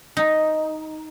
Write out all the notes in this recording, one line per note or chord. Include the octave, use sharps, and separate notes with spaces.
D#4